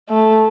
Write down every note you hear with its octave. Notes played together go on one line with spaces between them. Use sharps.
A3